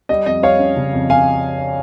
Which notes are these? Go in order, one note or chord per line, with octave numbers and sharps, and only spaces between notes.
G3 D#5
F2 D#5
G3 C#5 F5
C#4
C#3
F2
C#3 F5 G#5